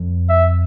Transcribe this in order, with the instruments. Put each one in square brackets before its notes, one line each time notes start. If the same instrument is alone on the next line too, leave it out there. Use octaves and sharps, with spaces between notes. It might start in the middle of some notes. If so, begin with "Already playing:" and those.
Already playing: [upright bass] F2
[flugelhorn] E5